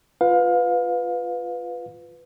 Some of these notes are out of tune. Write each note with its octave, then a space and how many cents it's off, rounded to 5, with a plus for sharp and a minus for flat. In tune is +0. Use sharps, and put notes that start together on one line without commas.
F4 +0 B4 +10 F5 +25